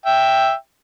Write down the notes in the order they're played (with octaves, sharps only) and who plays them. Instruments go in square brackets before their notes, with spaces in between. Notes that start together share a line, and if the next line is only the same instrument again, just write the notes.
[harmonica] E5 G5